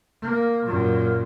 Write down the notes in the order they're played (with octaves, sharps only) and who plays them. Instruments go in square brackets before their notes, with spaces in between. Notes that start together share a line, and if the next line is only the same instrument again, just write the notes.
[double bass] A#3
F#2 A#2